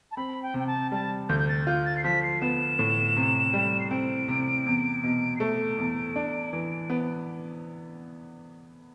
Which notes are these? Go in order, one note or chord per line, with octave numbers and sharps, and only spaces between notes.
A5
C4 B5
G5
C3 G5
A5
G3 A5
D2 G6
G6
A6
F4 G6
A6
C7
F3 B6
C7
B3 E7
A2
C3
G3
C7
C4 D7
C3
E2
B2
C7
A3 D7
E2
D4
E3
B3